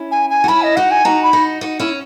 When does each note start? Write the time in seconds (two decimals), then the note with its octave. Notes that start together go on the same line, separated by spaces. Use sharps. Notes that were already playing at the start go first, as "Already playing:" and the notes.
Already playing: C#4 E4
0.11 G#5
0.30 G#5
0.44 F#4
0.48 C#4 E4 B5
0.62 D#5
0.76 D#4 F#4 F#5
0.91 G#5
1.05 D#4 F#4 A#5
1.23 B5
1.33 D#4 F#4
1.61 D#4 F#4
1.80 C#4 E4